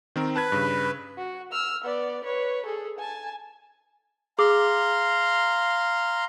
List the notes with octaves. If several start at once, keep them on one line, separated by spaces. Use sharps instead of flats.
D#3 C4 A#4
B4 A5 F#6 G#6
G2 C#3
F#4
E6 F6
B3 D5
B4 C#5
G#4 A4
G#5 A5
G#4 F5 A#5 C6 D6